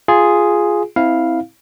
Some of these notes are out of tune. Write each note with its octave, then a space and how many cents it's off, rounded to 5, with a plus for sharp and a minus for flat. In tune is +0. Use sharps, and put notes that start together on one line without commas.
F4 +0 G#4 +0
C4 +0 E4 -15 F5 +0